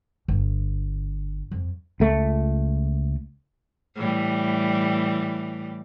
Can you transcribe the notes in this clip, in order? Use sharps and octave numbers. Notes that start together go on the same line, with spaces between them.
G1
F2
C#2 A3
A2 E3 G3